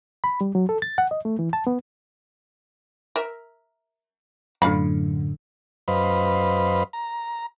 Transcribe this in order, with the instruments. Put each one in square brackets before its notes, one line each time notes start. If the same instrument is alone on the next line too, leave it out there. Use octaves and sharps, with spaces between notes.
[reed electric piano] B5
G3
F#3
A4
A6
F#5
D#5
A3
E3
A5
B3
[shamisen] A#4 E5
[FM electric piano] F#2 A2 D3 [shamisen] F4 F5 B5
[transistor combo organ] F#2 B4 C5 D#5 F5 B5
A#5